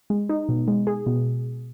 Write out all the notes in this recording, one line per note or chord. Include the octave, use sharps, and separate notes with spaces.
G#3
D#4
B2
G#3
G#4
B2